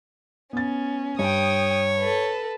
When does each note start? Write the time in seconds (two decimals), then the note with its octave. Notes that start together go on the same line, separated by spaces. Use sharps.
0.53 B3 C#4 A6
1.19 G2 C#5 G5 D#6
1.99 A4 B4